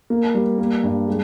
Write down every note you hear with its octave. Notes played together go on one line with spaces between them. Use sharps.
A#3
G3
A#3
G2
G#3